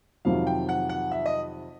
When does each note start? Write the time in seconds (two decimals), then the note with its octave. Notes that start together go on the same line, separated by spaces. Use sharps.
0.25 F2 C3 D#3 F#3 F5
0.47 G5
0.69 F#5
0.89 F#5
1.11 E5
1.26 D#5